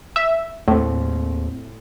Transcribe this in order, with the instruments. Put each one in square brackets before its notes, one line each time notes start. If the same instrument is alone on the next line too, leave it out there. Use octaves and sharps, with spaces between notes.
[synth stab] E5
[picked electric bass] D#2 C4 [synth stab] A2